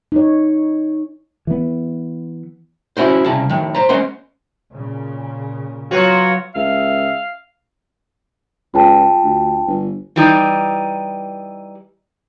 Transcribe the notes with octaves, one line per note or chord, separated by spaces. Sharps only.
D#4 C#5
E3 B3
C#4 E4 F#4 C5
C2 C#3 E4 A5
A2 D#3
C5 A#5
G#3 C#4 C5 F#5 C6
A#2 C#3
F#3 B3 F4 F#4 C#5
C#2 E5 F5
C#2 F4 G5 A5
D2
G1
E3 G3 D#4